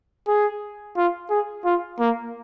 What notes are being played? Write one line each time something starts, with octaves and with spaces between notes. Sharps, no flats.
G#4
F4
G#4
F4
A#3